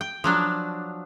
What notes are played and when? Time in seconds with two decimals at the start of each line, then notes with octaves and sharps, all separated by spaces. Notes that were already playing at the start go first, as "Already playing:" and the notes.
0.01 G5
0.24 F3 F#3 D4